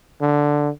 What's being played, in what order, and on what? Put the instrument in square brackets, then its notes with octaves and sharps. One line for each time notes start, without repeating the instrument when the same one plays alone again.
[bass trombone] D3